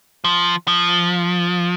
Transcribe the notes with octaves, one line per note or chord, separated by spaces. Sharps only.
F3
F3